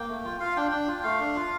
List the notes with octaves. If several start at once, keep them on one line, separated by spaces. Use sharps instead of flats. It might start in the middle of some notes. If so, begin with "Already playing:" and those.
Already playing: A#3 G5
A3
F4
F4 F5
D4 G5
D4 G5
F4
A3 F5
D4
F4